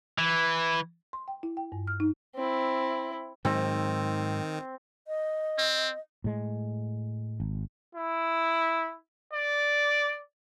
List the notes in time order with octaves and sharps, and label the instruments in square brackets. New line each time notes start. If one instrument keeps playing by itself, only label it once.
[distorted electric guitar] E3
[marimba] C6
G5
E4
G5
G2
F6
D#4
[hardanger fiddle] C4 E4
[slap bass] G#2 F#3 [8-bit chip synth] D#3 [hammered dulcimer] C4
[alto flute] D#5
[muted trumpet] C4
[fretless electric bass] A2 G#3
G#1
[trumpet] E4
D5